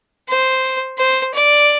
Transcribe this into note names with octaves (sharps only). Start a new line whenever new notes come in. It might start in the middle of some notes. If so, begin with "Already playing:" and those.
C5
C5
D5